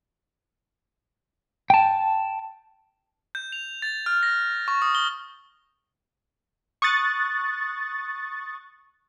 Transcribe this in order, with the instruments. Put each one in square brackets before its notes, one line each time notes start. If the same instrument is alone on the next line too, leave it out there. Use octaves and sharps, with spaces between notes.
[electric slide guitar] G5 A5
[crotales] G6
F7
A6
F6
A#6
C#6
D#6
G7
[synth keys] C#6 D#6 F#6 A6